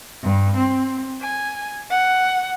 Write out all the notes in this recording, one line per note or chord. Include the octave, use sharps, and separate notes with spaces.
G2
C4
G#5
F#5